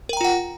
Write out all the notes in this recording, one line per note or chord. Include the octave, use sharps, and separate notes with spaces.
F4 A#4 F#5 G5 A#5